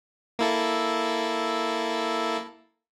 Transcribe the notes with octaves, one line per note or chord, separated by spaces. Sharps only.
A#3 E4 A4